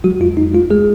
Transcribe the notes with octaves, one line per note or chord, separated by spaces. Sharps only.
F#3 G#3 F#4
F2 F4
F2 D#4
G#3 F4
G#3 G#4